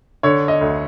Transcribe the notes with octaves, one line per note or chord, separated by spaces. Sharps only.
D3 C#5
D#5
D2